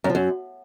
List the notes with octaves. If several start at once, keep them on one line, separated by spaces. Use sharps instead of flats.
F#2
F3
F#2